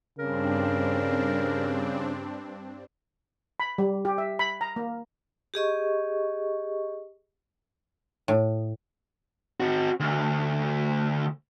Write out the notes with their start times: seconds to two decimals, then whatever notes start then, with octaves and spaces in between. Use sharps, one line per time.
0.19 G2 C#3 C4 D4 A#4
3.60 B5
3.78 G3
4.05 G4
4.18 E5
4.39 B5
4.61 A#5
4.76 A#3
5.54 G4 G#4 D#5 C#6
8.28 A2
9.60 C4 F#4
10.00 D2